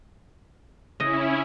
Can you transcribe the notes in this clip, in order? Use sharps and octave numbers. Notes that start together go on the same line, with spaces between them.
C#3 C#4 E4 D#5